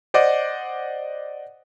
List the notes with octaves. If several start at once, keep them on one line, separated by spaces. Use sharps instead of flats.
C5 D5 D#5 F#5 D6